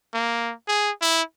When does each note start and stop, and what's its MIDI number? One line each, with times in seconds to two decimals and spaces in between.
0.14 0.53 58
0.68 0.91 68
1.02 1.22 64